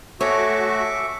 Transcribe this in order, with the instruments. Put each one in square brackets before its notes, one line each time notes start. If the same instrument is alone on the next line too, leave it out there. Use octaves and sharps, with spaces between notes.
[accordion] A3 F#4 [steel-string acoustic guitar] G#4 A4 C#5 [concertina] E5 C#6 D6